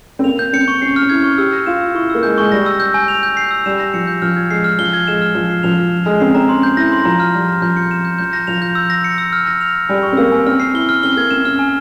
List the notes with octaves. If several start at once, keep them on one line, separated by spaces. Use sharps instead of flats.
C4
A#3 F7
G6
C4 C#7
C#6
C#4 C7
C#4 F6
E4 G#6
C#6
G4 E6
A#6
F4 E7
E6
E4 C#6
A#3 E6
G#3 G6
G#3 C#6
G3 A#6
E6
G6
G#5
F7
G6
C7
E6
G3 E7
A#6
F3 C#7
G6
F3 F6
G#6
G#3 C7
F6
F3 G7
G#6
G#3 E7
F6
F3 F6
C7
F3 F7
F6
E7
G#3 F6
C4 C7
C4 A#5
C#4 C6
G6
E4 A#6
C6
F3 A#5
F6
G3 A#6
A#5
F3 G6
C#7
E7
G6
F3 G6
A#6
F3 F7
G6
E6
A#6
C#7
E6
F6
A#6
F7
F6
G3 G#5
C#6
C4
A#3 E6
G#5
C4 F6
C7
E4 G7
F6
C4 G7
A#3 G#6
C4 E7
C#4 F6
G#5